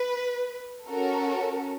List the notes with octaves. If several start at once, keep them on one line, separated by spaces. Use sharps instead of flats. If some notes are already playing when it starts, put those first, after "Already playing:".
Already playing: B4
C#4 F#4 A4 A#4